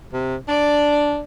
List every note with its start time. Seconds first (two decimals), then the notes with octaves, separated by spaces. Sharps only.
0.13 C3
0.48 D4 D5